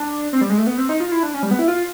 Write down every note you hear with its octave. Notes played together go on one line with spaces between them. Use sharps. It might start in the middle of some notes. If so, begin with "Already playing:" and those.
Already playing: D4
C4
G3
G#3
A3
B3
C4
D#4
F4
E4
D4
C#4
G3
B3
E4
F4